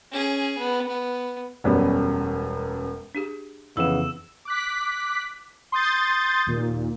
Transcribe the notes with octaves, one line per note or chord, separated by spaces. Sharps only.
C#4 G#4
B3
B3
E1 F#2 G3 B3 C#4
D4 G4 G#4
F2 C#3 E3 B3 E6 E7
D6 F#6 B6
C6 D#6 G6 A6
D#2 A#2